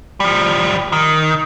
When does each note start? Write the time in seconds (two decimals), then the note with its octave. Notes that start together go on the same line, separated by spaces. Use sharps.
0.20 F3 G3
0.92 D#3